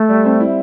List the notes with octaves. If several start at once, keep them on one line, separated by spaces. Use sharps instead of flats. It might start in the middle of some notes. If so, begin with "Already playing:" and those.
Already playing: A3
G3
C4
E4